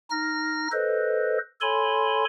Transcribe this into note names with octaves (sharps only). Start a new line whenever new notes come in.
D#4 F6 A#6
A4 B4 C5 D#5
A4 C#5 G#5 B5 C6